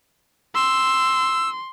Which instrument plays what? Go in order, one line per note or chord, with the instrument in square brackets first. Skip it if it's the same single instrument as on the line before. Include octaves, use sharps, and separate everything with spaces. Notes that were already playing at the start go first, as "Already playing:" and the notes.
[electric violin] C6 [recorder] E6